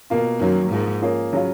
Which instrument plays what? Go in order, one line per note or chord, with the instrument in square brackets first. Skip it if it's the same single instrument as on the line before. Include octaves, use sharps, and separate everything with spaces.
[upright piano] B2 A#3 F4
[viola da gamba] F#2 [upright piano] D#3 F#3 A#3
[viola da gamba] G#2 [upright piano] F3 A#3 D#4
[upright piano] F3 A#3 C#4 F4 G#4
C#3 F#3 C#4 F4